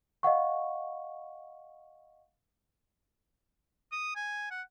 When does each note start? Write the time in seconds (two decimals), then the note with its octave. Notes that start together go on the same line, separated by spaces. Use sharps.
0.23 D#5 F5 F#5 C#6
3.92 D#6
4.16 G#5
4.51 F#5